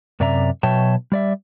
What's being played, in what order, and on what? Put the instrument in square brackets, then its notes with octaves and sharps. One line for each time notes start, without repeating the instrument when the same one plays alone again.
[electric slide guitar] F#2 C3 D5 E5 A#5
B2 F#3 C#5 E5 G5 A5
G3 D5 E5